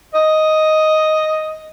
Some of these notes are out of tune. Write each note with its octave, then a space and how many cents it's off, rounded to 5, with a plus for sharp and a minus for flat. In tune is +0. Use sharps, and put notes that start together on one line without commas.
D#5 +5